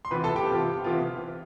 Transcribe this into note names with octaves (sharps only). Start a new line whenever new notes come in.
C6
C3 E3 B3 F4 B4 B5
A4 A5
G4 G5
C3 E3 B3 F4
C3 E3 B3 F4